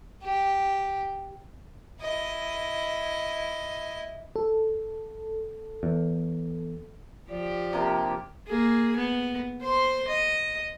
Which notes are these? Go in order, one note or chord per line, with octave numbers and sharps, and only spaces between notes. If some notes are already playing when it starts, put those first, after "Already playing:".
G4
E4 D#5
A4
E2
F3 G4 D5
C3 A#3 D4
A#3 G#4
B3
C5 C6
D#5